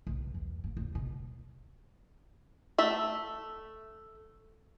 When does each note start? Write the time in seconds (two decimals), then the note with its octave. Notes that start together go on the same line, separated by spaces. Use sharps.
0.07 B1
0.34 E2
0.64 A#3
0.77 D#2
0.95 B2
2.78 A3 E5